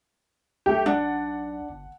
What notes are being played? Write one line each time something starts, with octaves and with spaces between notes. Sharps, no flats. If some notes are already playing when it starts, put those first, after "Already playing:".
B1 A3 G4
D4 F#5
G1